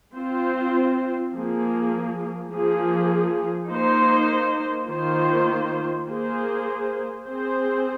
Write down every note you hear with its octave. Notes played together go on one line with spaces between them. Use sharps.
C4 F4 C5
F3 A#3 G#4
F3 A#3 G#4
A#3 D#4 C5
D#3 A#3 F4 C5
A#3 G#4 C5
C4 G#4 C5